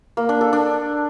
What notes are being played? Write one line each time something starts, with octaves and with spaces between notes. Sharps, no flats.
A#3
D4
A4
D4